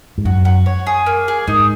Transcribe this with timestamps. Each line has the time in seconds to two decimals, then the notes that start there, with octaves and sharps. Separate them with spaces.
0.18 G#2
0.25 F#2 F#4
0.45 F#4
0.66 C#5
0.87 G#4
1.06 A#3
1.28 G#4
1.47 G#2 D#4